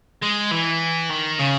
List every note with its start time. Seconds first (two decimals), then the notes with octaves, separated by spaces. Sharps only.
0.23 G#3
0.52 E3
1.10 D#3
1.39 C#3